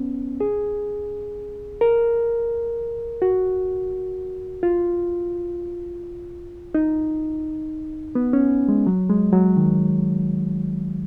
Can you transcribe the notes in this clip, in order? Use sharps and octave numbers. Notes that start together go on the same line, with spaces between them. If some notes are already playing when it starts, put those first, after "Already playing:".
Already playing: B3 C#4
G#4
A#4
F#4
F4
D#4
B3
C#4
G#3
F#3
G#3
F#3
D#3